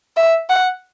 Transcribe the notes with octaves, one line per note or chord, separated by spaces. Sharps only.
E5
F#5